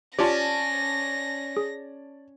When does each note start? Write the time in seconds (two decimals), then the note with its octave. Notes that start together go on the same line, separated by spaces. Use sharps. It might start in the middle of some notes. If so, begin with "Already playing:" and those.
0.19 C#4 F4 G4 D5 A5 A#6
1.57 G#4